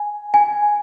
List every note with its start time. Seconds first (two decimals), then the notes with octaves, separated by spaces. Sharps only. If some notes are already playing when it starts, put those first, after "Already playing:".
Already playing: G#5
0.34 G#5